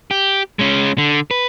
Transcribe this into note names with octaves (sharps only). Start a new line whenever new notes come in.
G4
G#3 C#4
D3
B4